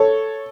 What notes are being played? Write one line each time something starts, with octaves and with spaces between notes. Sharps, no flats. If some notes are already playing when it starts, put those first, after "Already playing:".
Already playing: A4 C#5